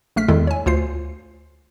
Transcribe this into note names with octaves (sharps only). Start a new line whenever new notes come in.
A#1 A3 F6 B6
E2 D#3 G#3 E4 A4
C#5 G#5
D2 F4 C5 C7